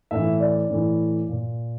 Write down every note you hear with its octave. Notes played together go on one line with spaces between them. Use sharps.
A2 E3 E5
D5
A2 E3
A#2